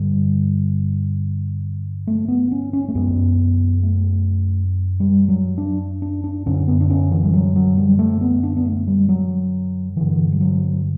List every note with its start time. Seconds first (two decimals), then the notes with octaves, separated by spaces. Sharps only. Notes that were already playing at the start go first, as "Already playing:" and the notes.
Already playing: G2 D3 G3
2.07 A3
2.28 B3
2.51 C#4
2.73 C#4
2.88 A3
2.95 F#2 C#3 B3
3.83 A3
5.00 G3
5.28 F#3
5.58 D4
6.02 D4
6.24 D4
6.46 F#2 D3 C#4
6.68 B3
6.81 D4
6.90 C#4
7.11 E3
7.23 G3
7.33 F#3
7.56 F#3
7.78 G3
7.99 A3
8.21 B3
8.43 D4
8.57 B3
8.65 A3
8.87 G3
9.09 F#3
9.96 G2 D3 E3
10.32 G3
10.41 F#3